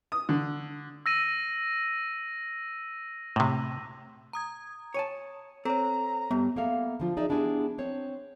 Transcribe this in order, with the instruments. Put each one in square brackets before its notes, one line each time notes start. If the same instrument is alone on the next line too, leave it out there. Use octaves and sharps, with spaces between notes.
[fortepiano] D#6
D3
[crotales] E6 A#6 D#7
[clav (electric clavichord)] A2 C3
[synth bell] A#5 D#6 G#6
[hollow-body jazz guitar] C#5 G#5 A5
[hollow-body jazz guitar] C4 [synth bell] A4 C#5 [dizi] A#5
[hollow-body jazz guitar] G2 [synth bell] B3
[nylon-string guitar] A#3 B3 A4 E5 F5
D3 F3 F4
D#4 G#4 D5 E5
B3 D4 E4 G4 G#4
C4 C#5